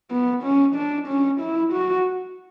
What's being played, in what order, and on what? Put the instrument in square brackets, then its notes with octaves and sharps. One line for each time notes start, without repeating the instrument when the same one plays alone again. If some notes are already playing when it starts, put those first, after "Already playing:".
[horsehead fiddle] B3
C#4
D4
C#4
E4
F#4